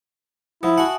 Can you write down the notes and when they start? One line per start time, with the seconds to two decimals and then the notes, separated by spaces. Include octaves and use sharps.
0.63 F3 E4 E5 F#5 D#6
0.78 F#4 F#5 G#5 A5